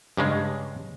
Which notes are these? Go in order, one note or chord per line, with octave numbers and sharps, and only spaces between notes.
G2 C#3 G#3